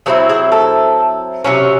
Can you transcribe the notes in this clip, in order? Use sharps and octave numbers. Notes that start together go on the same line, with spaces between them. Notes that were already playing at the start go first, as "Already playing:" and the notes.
F#3 C4 E4 G#4
G#4
A4
C3 F#3 C#4